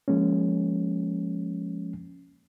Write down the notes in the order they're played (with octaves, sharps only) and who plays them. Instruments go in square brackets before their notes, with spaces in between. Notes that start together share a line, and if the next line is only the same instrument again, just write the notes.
[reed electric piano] F3 G#3 A#3 C#4